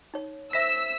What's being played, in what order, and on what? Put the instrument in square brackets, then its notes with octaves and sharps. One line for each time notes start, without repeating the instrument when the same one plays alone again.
[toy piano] D#4 C#5
[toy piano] C5 E5 [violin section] E6 [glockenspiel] B6